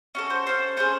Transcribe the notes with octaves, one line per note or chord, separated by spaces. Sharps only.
C#4 F#4 A4
C5
C#4 F#4 A4 C5
C#4 E4 G#4 C5